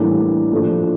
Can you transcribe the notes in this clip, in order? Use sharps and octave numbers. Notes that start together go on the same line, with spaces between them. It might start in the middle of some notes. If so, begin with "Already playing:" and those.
Already playing: A2 E3 G3 A#3 D4
A#2 F3 A3 D4